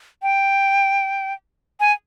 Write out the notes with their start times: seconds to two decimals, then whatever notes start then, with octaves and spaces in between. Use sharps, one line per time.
0.22 G5
1.80 G#5